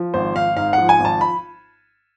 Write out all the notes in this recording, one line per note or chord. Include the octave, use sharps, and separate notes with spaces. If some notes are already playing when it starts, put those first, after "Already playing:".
Already playing: F3
G#1 C5
G#1 F5
G#2 F5
F3 F#5
G#5
G#1
A5
B5